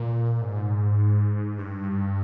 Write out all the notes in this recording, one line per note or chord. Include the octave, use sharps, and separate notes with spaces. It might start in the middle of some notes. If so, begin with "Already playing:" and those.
Already playing: A#2
G#2
G2